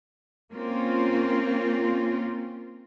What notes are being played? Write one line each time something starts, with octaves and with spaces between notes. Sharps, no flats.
A#3 C4 C#4 F4